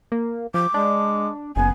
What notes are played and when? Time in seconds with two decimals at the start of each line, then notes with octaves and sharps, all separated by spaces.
0.12 A#3
0.54 F3 D6
0.74 G#3 D4
1.56 F#1 B3 G#5